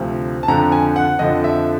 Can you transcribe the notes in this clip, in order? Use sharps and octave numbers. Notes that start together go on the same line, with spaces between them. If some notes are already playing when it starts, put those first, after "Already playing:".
Already playing: D2 C3 F3
A5
F2 D3 F3 A#5
G#5
F#5
F2 D3 F3 D#5
E5